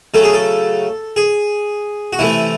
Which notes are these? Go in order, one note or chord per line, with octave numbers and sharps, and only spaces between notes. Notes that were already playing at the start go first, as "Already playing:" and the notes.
C#3 F#3 A3 A4
G#4
A4
G#4
F#4
C3 E3 A3 E4